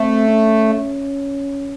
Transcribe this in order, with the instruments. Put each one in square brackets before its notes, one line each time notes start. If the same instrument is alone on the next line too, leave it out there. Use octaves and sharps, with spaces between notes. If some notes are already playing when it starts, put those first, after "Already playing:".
Already playing: [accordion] A3 [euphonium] C4
[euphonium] C#4